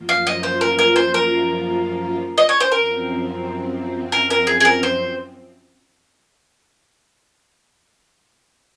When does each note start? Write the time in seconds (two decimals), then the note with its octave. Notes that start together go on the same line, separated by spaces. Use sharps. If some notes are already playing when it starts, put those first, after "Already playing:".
Already playing: F#2 F3 A#3 F4
0.09 F5
0.27 D#5
0.43 C5
0.61 A#4
0.79 A#4
0.96 C5
1.14 A#4
2.38 D#5
2.49 C#5
2.60 C5
2.71 F#2 F3 C4 A#4
4.12 A#4
4.30 A#4
4.47 G#4
4.61 G#4
4.65 A#4
4.83 C5